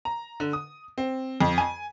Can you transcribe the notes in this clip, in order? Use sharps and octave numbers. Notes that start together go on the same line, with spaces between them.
A#5
D3
D#6
C4
F2
G#5